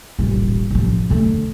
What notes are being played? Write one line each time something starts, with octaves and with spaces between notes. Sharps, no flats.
D#1 A1
A1 F3
D3 A3